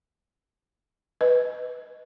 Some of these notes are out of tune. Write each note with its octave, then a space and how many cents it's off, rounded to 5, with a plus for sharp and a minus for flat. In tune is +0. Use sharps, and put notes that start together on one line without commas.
B4 +0 D#5 +0